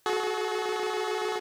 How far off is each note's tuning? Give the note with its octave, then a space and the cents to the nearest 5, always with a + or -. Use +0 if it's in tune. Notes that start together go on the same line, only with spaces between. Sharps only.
F#4 +0 A4 -45